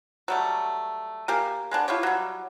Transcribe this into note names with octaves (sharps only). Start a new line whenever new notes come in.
F#3 G3 A3
A#3 G4 G#5
G#3 B3 D4
E4 F4 G4 C#5
F#3 G3